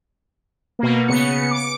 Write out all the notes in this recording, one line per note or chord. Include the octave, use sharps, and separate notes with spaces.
B2 A#3
C#3 B3 C#7
D6